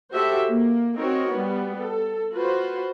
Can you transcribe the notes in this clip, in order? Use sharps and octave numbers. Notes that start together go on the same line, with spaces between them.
F#4 G4 A4 C5 E5
A#3
C4 D#4 F#4 A#4 C#5
G3 B3
A4
F4 F#4 B4 C5